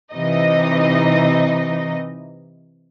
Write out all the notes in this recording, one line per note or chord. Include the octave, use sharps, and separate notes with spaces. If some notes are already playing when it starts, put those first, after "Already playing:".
C3 E3 D#4 D#5